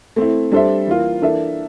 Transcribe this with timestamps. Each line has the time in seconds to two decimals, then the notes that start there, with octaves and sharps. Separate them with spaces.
0.16 A3 C4 E4
0.52 G3 D4 A4 C5 E5
0.87 E3 A#3 F4
1.22 E3 A#3 D4 A4 E5